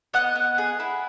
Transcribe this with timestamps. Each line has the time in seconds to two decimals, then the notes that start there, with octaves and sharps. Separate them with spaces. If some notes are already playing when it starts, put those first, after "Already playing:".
0.14 B3 D#5 F#5
0.36 B3
0.58 G#4
0.80 E4